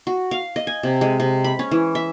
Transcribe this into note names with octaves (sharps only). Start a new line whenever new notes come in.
F#4
F5
D#5
G#5
C3
G#3
C3
B5
C#4
E3
E5